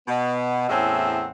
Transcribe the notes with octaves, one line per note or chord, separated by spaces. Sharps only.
B2 B3
E2 A2 C4 C#4 E5 F#5